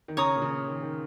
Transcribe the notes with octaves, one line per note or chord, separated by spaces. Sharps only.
D#3
C#3 C#5 A#5 D#6
A#2
C#3
D#3
D#3